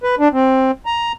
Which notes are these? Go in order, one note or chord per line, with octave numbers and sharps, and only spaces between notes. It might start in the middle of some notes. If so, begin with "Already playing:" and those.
B4
D4
C4
A#5